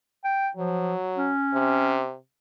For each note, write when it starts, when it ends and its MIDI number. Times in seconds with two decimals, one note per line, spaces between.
0.24 0.50 79
0.57 0.94 53
0.57 1.31 54
1.17 2.02 61
1.53 2.15 48